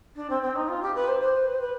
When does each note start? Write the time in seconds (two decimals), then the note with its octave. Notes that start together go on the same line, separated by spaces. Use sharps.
0.16 D4
0.30 C4
0.42 C4
0.56 D#4
0.68 F4
0.82 G4
0.95 B4
1.08 C5
1.21 C5
1.48 B4
1.54 C5
1.61 B4